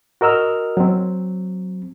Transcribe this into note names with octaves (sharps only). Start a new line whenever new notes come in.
F#4 A#4 D#5 E6 F6
F#3 C4